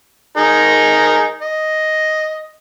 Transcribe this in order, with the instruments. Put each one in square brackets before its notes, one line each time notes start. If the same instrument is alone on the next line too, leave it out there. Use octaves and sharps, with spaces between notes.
[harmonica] D#4 G#4 A#4
D#5